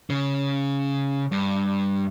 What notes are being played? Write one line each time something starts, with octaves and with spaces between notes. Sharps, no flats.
C#3
G2